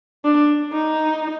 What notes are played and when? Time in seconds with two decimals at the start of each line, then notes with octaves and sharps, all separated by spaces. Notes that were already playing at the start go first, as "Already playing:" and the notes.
0.25 D4
0.73 D#4